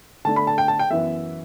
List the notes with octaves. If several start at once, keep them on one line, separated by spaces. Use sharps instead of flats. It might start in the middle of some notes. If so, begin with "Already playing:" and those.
D3 A3 D4 A5
B5
A5
G5
A5
G5
F#2 E3 B3 E5